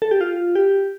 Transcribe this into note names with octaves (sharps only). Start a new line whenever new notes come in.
A4
G4
F4
G4